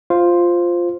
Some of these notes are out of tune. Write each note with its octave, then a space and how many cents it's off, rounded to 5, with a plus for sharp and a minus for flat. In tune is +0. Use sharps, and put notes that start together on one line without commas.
F4 +0 C5 +0